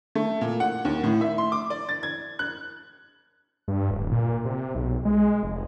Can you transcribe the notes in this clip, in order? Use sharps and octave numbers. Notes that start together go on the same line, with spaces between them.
A3
A#2
F#5
D#2
A2
E5
C6
D6
D5
A6
G#6
F#6
G2
D1
A#2
C3
B1
G#3
F1